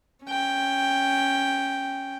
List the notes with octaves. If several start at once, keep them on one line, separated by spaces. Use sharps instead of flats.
C#4 G5